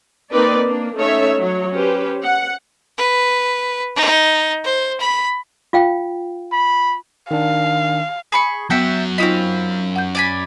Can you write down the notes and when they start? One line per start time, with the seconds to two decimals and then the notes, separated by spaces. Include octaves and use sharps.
0.31 A#3 C4 D#4 A#4 B4 D5
0.64 A#3 D4
0.97 A3 C#4 D#4 A4 C#5 E5
1.38 F#3 C#5
1.74 C#4 G4 B4 C5
2.24 F#5
2.98 B4
3.96 D#4
4.64 C5
5.00 B5
5.73 F4 F5 G5
6.52 B5
7.31 D#3 D4 F5
8.32 G#4 B5 C#6
8.70 F#2 F#3 B3 E5 F#5 G5
9.18 C4 D#4 F4 D#5 F5 B5
9.96 F#5 G6
10.15 D5 G#5 B5